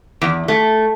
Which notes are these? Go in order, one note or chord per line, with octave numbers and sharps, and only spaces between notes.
E2
A3